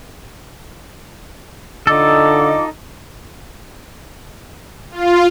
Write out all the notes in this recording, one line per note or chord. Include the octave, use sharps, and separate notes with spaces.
D3 D#4 F4 A4 D#5 D6
F4